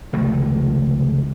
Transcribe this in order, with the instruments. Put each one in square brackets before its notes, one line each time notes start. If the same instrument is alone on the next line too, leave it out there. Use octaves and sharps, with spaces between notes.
[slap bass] F1 C#2 D#3 A3